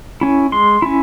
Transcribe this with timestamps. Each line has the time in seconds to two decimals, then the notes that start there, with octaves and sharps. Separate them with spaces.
0.21 C#4 E4
0.52 G#3 C6
0.82 C#4 E4